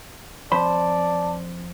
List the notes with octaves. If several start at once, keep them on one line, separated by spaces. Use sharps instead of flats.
F2 C5 D5 A5 B5